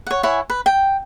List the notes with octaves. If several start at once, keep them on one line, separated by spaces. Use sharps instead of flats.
C#5 F#5
E4 C#5 F#5 G#5
B4
G5